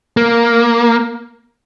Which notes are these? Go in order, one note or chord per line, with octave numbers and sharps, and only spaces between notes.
A#3